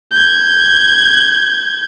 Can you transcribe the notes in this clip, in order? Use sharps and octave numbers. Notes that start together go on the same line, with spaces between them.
G6 G#6